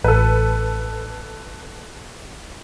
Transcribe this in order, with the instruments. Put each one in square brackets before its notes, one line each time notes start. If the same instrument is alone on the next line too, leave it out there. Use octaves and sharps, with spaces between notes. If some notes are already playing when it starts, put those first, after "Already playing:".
[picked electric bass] A1 [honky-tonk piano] A4 B4